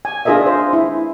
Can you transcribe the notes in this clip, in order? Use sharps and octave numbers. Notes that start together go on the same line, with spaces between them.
G#5
D4 F4 G#4 A#4 D#5 E5
C5
E4